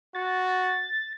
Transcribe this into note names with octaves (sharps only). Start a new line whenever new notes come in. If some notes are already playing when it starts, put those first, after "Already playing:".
F#4 A6